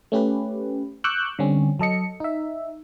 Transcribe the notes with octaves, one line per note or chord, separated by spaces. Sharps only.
A3 C#4 G4 B4
C#6 D6 E6 F#6 G6
D3 G3 C4 C#4
F#3 A4 D#5 C#7
D#4 E5